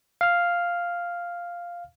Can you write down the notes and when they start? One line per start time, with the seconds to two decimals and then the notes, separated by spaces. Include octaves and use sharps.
0.21 F5 F6